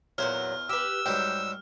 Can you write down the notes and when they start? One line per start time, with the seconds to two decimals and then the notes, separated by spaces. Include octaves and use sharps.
0.18 E2 A#2 F#3 C5 F6
0.69 G4 B4 E6
1.06 G#2 F#3 G3 G5